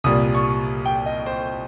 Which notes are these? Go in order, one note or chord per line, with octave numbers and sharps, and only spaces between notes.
C2 A#2 G3 D#6
C#6
G5
D#5
C5